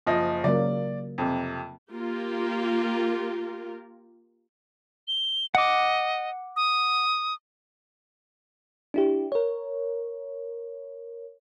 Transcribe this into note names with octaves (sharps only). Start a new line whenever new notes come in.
F#1 F3 D#5
C#3 F#3 A#3 D5
F2 C3
A#3 F4 G4 A#4
G7
D#5 F#5 D6
D#6
D4 E4 G4
A#4 C#5